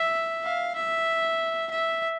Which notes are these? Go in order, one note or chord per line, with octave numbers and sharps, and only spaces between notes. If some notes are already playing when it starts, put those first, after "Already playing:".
Already playing: E5
F5
E5
E5